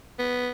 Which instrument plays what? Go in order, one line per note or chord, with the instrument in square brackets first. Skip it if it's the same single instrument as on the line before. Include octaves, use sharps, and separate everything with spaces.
[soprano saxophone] B3